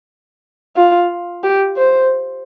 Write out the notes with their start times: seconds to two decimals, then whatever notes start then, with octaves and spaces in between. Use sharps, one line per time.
0.76 F4
1.44 G4
1.77 C5